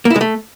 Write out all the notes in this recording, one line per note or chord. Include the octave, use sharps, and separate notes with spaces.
A#3
E4
G#3
A3